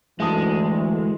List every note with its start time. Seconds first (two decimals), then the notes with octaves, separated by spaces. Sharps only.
0.20 D2 E3 G#3 E4 A5 D#6